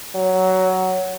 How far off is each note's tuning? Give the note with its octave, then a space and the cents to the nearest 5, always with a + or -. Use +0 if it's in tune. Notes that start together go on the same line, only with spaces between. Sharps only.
F#3 +10